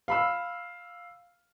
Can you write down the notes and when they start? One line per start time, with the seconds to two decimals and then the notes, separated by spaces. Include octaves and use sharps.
0.08 F5 B5 E6